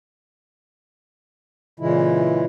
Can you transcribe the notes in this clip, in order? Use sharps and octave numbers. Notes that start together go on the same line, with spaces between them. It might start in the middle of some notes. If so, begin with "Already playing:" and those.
A#2 C#3 E3 G#3 E4